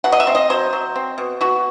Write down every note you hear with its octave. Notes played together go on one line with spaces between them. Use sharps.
B2 F#5
D#5
E5
C4
D#5
F#3 C5
F#3
C4
B2
B2 F#4